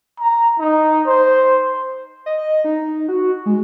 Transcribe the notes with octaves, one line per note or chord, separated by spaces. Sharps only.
A#5
D#4
C5
D#5
D#4
F#4
G#3